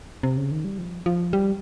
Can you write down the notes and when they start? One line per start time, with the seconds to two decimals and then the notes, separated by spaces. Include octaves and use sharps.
0.23 C3
0.37 C#3
0.51 D#3
0.65 G3
0.78 F3
1.06 F3
1.33 G3